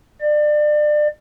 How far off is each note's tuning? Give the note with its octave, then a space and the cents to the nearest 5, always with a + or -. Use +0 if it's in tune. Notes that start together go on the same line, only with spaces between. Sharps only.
D5 +30